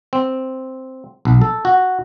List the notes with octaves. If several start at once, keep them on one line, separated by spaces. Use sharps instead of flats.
C4
B1
A4
F#4